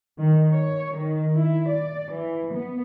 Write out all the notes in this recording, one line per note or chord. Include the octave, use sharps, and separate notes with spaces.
D#3
C#5
D#3
E4
D5
E3
B3